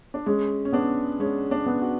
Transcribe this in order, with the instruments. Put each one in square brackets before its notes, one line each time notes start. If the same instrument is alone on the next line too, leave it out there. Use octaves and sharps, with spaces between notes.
[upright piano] D4
[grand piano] G#3 [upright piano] C#4
[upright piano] C#4
[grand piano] B3 [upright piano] D4
[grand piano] G#3 [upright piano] C#4
[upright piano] D4
[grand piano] B3
[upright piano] F#4